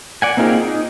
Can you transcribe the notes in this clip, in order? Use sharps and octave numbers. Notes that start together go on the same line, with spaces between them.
D5 F#5 G#5
A#3 C4 D#4 F4 G#4
D#4